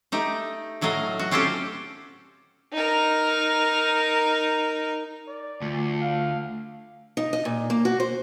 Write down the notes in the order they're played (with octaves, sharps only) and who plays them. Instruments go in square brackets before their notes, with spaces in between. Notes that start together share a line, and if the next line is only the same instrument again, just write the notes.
[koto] A3 D#4 G4
A2 F#3 A3 D#5 F5
F#4
C4 C#4 F4 G4 A4 C5
[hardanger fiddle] D#4 A#4
[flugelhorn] D5
[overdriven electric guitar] D2 [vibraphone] A3 F4
[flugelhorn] F5
[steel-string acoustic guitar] D#4
D#5
A#2
A#3
F#4
C5